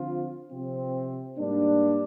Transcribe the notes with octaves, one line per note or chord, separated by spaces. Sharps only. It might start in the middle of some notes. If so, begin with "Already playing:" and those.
Already playing: D3 F3 C4 F4
C3 F3 C4
G#2 G3 A#3 D4